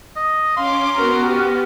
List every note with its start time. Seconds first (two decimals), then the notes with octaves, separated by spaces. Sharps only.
0.16 D#5
0.57 C#4 F5 C6 D6
0.95 B3 F#4 A#4 A#5 F6
1.25 G4